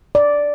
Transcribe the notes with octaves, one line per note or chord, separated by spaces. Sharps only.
D5